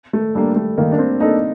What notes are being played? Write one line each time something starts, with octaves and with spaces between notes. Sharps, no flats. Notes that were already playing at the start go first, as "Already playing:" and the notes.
A3
G3 A#3 D4 A4
A3
D#3 A#3
D4
C4
A#3 D4 D#4 A4